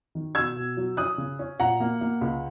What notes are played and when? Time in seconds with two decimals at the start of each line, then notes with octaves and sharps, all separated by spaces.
0.15 D#3
0.35 B2 E6 G#6
0.56 B2
0.77 F#3
0.97 C#4 D#6 F#6
1.18 C#3
1.39 C#4
1.59 A#2 F#5 A#5
1.80 A#3
2.01 A#3
2.21 C#2